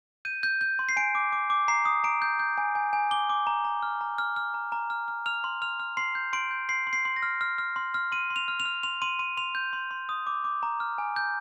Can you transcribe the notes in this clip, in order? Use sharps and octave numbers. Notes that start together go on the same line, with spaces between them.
G6 D#7
G6
G6
C6
C7
G#5 D7
D6
D6
D6
A#5 C7
D#6
A#5 D7
G6
G6
G#5
G#5
G#5
D6 G7
D6
A#5
A#5
F6
A#5
F6
F6
A#5
A#5
F6
F6
F6 F7
C6
F6 F7
F6
C6 C7
G6
C6 D7
G6
C6 C7
C6
C7
C6
A#6
F6
F6
F6
C6
F6
C6 D#7
C6
F7
F6
F7
F6
C6 F7
C6 D#7
C6 D#7
C6 F7
G6
C6
C6
D#6
D6
D6
A#5
F6
G#5
G6